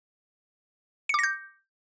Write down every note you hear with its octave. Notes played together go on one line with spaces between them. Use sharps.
D6 G6 A#6 C#7